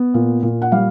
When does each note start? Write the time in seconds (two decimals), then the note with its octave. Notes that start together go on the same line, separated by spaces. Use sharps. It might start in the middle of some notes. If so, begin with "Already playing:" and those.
Already playing: B3
0.14 A#2
0.43 A#2
0.62 F#5
0.72 G3 F5